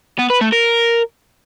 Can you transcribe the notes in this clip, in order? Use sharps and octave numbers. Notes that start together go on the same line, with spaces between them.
B3
B4
A3
A#4